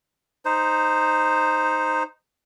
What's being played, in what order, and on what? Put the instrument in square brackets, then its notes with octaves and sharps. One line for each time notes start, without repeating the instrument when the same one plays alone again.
[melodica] D#4 C5